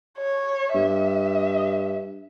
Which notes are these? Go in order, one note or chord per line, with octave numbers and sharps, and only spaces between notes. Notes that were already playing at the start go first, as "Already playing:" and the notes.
C#5
G2 E5